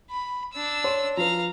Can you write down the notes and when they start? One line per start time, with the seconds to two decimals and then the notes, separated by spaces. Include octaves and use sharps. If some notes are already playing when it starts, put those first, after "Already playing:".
0.10 B5
0.53 D4 E6
0.84 C#5 C6
1.17 F3 B4 F5 A#5